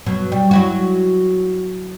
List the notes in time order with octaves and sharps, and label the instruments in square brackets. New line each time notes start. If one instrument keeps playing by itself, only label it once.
[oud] B2 F#3
G3
F#3 E4 F#4